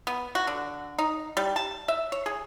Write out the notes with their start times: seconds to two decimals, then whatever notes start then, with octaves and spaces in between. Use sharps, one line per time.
0.07 B3
0.35 F#4
0.47 D3
0.98 D#4
1.37 G3
1.56 A5
1.88 E5
2.12 C#5
2.26 G#4